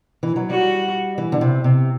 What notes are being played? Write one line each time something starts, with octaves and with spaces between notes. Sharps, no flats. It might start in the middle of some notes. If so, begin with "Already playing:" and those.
E3
F#3
G3 F#4
E3
D3
C3
C3